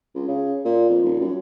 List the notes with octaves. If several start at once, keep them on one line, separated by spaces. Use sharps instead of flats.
C#2
C#3
A#2
F2
D#1
F#2